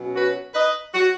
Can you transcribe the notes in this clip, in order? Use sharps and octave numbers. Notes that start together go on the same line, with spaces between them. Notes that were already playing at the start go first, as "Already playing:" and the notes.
Already playing: B2 F#3 C#4
F#4 B4
B4 D#5
F#4